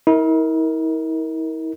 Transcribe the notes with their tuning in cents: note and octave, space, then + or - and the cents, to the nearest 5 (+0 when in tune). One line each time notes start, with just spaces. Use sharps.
E4 -45 A#4 +0